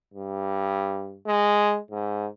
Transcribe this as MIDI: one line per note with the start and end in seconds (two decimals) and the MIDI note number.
0.14 1.18 43
1.27 1.78 56
1.91 2.26 44